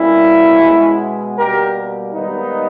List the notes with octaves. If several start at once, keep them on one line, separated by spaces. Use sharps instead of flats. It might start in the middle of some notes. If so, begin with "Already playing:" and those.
Already playing: B2 G3 A#3 C#4 E4
B2 G#3 B3
B2 G3 A#3 G4 A#4
G#2 D#3 G3 A#3 B3 D#4